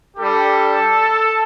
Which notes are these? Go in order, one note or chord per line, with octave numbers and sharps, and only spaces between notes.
G3 D4 G4 A4